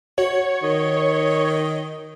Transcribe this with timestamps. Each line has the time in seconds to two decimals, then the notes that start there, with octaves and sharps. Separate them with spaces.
0.18 F#4 C#5
0.63 D#3